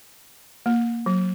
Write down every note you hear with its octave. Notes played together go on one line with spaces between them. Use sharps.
A#3
F#3